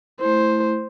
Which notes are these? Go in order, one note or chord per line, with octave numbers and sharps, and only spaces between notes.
A3 E4 C5